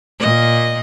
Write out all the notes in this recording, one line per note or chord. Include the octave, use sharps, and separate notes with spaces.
A#2 D#5